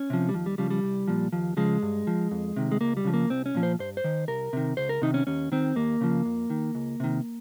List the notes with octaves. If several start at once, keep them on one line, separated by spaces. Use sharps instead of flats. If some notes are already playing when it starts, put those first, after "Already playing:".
Already playing: C#4
C3 F3
G3
D#2 F3
G3
C#3 F3 G3
G3
C2
A#2 F3
D#2 F3
C#3 F3 G#3
G2
F3
F2
C3 D#3
G#3
C#2 A#3
G3
C#3 F3
A#3
C2 C4
C#4
A#2 F3
C5
G2 C5
C5
D#3
C2 A#4
C3 D#3
C#2 C5
A#4
C3 D#3 D#4
C#4
D#2 C#4
D#3 C4
D#2 A#3
C#3 F3
F2
D#3
C#2
C3 D#3